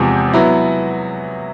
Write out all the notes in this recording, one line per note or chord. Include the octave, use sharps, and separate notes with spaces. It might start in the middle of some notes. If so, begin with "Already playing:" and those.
Already playing: E2 C3 F3 G#3 C4
F#3 B3 E4